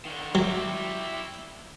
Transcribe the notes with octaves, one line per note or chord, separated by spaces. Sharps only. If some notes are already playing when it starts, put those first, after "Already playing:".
D3 D#3
F#3 G3 E4